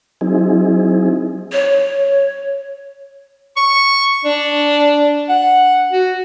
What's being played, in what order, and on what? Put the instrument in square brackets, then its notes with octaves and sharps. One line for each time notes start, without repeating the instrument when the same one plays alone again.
[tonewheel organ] F#3 C4 D#4 E4 G#4
[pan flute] C#5
[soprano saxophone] C#6
D4
F#5
F#4